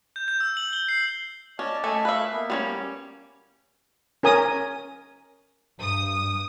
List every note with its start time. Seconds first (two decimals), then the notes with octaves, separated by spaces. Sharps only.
0.16 G6
0.28 G6
0.40 E6
0.57 F#7
0.73 G7
0.88 C7
1.59 C#4 D5 D#5 A5
1.84 A3 A4 D#5 E5 G#5
2.05 A3 B4 E5 F5 F#6
2.31 A#3 B3
2.50 G3 C4 C#4
4.23 C#4 A#4 G#5 D#6
5.81 G2 D#6